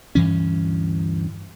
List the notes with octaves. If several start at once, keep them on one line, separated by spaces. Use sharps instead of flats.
D2 G2 E3 C#4